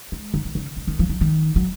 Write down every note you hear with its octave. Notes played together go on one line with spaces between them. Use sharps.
G#3
D#3
D#3
C#3
C#3
D#3
F3
F#3
D#3
F#3